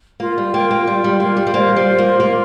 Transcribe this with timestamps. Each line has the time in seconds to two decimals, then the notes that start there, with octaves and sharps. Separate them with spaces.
0.20 A#3 F4
0.38 G3
0.53 A#3 G5
0.71 A#3
0.87 G3 F4
1.04 G3
1.20 A#3 F4
1.37 G3
1.47 G3
1.54 A#3 C5
1.76 G3
1.87 F4
1.98 A#3
2.20 A#3 F4